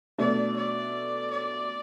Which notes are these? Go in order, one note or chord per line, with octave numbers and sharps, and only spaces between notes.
B2 A3 D4 D5
D5
D5